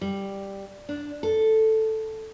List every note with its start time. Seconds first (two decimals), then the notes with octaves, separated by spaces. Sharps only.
0.01 G3
0.89 D4
1.23 A4